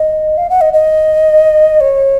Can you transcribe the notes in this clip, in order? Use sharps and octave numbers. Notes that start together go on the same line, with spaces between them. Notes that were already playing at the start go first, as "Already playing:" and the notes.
Already playing: D#5
F5
F#5
D#5
D#5
C#5